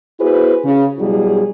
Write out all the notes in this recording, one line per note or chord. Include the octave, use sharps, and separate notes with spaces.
B3 E4 F#4 G#4 B4 C5
C#3
B2 F#3 G3 E4 G#4